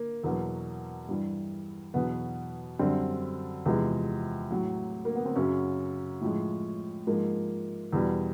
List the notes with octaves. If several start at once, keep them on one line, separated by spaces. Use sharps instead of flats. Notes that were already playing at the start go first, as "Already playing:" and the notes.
Already playing: A#3
E2 B2 F#3 A#3
G2 E3 G3
E2 B2 F#3 B3
F#2 D3 G3 C4
E2 C3 F3 G#3
A2 F#3
A#3
B3
C4
F#2 C#3 F#3 C#4
A2 F3 G#3
G#2 F3 G#3 A#3
E2 B2 G3